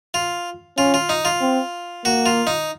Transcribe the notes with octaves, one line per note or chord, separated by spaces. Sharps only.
F4
C#4 F4
F4
D#4
F4
C4
A#3 F#4
F4
D#4